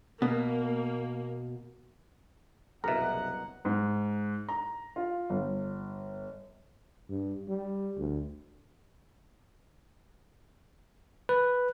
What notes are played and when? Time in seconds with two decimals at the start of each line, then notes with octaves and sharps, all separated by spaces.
0.22 B2 A#3
2.84 F#1 C2 F#2 B2 A#4 E5 F#5 A#5
3.65 G#2
4.48 A#5
4.96 F4
5.30 G1
7.09 G2
7.48 G3
7.97 D2
11.29 B4